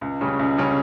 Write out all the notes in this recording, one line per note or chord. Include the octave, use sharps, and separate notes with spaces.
C#2
C#3 G3 C#4
C#2
C#3 G3 C#4